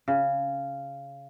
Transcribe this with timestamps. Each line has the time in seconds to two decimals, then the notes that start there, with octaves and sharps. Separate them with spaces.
0.08 C#3